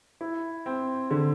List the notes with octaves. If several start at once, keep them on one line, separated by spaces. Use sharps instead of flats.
E4
C4
D3